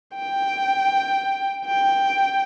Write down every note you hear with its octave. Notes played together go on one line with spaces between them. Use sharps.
G5
G5